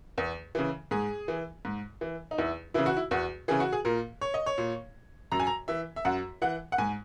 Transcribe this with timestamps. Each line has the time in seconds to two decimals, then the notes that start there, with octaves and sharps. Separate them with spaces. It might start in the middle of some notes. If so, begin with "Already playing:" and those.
0.18 E2
0.55 C#3 E3
0.91 G#2 G#4
1.28 E3
1.65 G#2
2.01 E3
2.31 D#4
2.38 E2 E4
2.74 C#3 E3 E4
2.86 F#4
2.97 E4
3.11 E2 F#4
3.48 C#3 E3 G#4
3.60 F#4
3.73 G#4
3.85 A#2 A#4
4.21 C#5
4.34 D#5
4.46 C#5
4.58 A#2
5.32 F#2 A#5
5.40 G#5
5.47 A#5
5.68 E3 E5
5.96 E5
6.05 F#2 F#5
6.42 E3 F#5
6.72 F#5
6.78 G#2 G#5